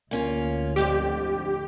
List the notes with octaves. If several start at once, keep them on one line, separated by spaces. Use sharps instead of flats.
D2 A#3 C#4 F4
F2 G#2 D3 G4